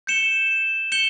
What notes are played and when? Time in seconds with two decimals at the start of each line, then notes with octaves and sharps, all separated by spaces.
0.07 G6 C#7 E7 G7
0.92 G6 C#7 E7 G7